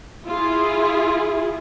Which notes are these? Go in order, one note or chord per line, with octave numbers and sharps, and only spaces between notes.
E4 F4 G#4